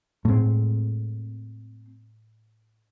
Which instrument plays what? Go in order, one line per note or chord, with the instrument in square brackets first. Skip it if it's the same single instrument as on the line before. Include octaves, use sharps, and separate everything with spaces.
[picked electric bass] A2 G#3 [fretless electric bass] A3 C4